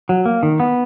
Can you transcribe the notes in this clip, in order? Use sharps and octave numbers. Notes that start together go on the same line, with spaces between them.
F#3
A#3
D#3
B3